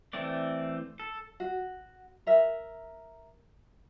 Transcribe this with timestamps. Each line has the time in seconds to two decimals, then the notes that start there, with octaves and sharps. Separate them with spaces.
0.13 E3 A3 C4 D5
1.00 A4
1.40 F#4
2.27 A#4 E5